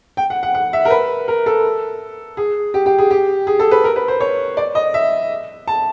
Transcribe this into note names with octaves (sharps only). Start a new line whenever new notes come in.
G5
F#5
F#5
F#5
E5
A#4
B4
A#4
A4
G#4
G4
G4
G#4
G4
G#4
A4
B4
A#4
B4
C5
C#5
D5
D#5
E5
A5